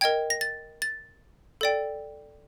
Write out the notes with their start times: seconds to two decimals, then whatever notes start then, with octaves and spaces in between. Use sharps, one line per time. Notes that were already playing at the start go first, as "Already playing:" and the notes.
0.01 A#4 D#5 G5 G#6
0.30 A#6
0.41 A6
0.82 A6
1.61 A4 D5 G5